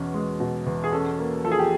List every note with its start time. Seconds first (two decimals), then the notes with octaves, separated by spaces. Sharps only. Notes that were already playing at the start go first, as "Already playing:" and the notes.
Already playing: E2 B2 C#4
0.14 G#3
0.40 B2
0.67 E2
0.84 G#4
0.92 C#4 A4
1.19 A#3
1.44 F3 A4
1.52 G#4
1.59 G4